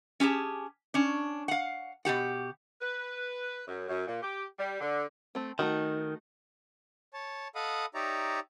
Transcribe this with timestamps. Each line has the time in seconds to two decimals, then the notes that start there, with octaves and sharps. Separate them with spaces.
0.20 C#4 G4 G#4 A5
0.94 C#4 D4
1.48 F5 F#5
2.05 B2 D#3 G4 F#5
2.81 B4
3.68 F#2
3.88 F#2
4.07 A#2
4.22 G4
4.59 G3
4.81 D3
5.35 A3 C4
5.59 D#3 A3 D#4 F#4
7.13 C#5 A5
7.55 A4 D#5 F5 F#5 B5 D#6
7.94 D#4 G4 C#5 D5 E5 A#5